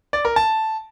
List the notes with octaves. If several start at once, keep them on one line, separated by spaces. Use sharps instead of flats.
D5
A#4
A5